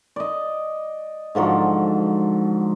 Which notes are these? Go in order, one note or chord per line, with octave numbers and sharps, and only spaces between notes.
D5 D#5
G#2 D3 F3 F#3